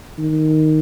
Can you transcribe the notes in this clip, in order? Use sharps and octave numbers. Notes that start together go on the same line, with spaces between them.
D#3